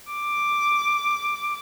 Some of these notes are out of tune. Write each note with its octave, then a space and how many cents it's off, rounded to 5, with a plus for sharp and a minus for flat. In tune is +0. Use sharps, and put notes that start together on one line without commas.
D6 +5